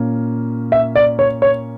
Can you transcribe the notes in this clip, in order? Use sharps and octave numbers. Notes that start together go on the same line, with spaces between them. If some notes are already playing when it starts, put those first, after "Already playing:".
Already playing: A#2 A#3 C#4
E5
D5
C#5
C#5